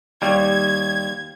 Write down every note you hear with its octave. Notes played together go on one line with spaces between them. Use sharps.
D#2 G3 G#6